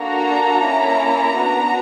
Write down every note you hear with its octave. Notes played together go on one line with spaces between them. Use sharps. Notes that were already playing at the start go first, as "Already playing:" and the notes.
Already playing: A#3 D4 F#4 A4 A#5
A#3 C#4 E4 A4
B3 D4 F#4